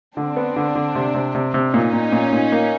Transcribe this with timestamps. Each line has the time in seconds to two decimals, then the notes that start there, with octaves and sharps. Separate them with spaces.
0.16 D3 C4 D4
0.36 B3
0.56 D3
0.75 D3
0.95 C3
1.15 C3
1.35 C3
1.54 C3
1.73 A#2 C#4 D#4
1.93 A#2
2.12 A#2
2.33 A#2
2.52 A#3